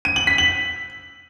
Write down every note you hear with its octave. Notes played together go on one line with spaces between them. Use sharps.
D#7
F#7
B6
F#7